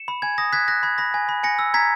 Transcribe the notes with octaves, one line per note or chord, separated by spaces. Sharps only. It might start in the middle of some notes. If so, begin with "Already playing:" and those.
Already playing: C#7 E7
B5
G#5 G#6
D#6 A#6
F#6 G#6 B6
F#6 A#6
B5 G#6
B5 A#6
G#5
B5
G#5 A#6 C#7
E6
A#5 G#6 B6